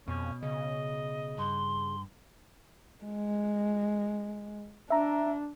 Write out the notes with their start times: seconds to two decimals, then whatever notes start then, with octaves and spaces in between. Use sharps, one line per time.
0.08 F2 B2 C#4
0.43 C#3 D#5
1.38 G2 C6
3.04 G#3
4.90 D4 E5 A#5